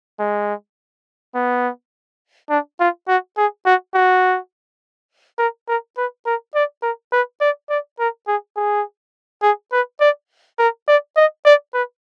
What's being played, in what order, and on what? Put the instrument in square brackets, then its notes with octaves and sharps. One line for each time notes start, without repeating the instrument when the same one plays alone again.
[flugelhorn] G#3
B3
D4
F4
F#4
G#4
F#4
F#4
A#4
A#4
B4
A#4
D5
A#4
B4
D5
D5
A#4
G#4
G#4
G#4
B4
D5
A#4
D5
D#5
D5
B4